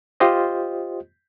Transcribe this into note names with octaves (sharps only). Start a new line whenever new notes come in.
F4 G4 C5 D#5